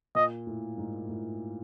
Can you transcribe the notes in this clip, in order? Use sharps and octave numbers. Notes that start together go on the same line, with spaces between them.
A#2 D#5
A2
G#2
A2